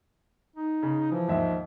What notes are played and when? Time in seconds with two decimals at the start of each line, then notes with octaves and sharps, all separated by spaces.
0.56 D#4
0.83 C#3
1.12 E3 F3
1.28 D#2 G#2 E5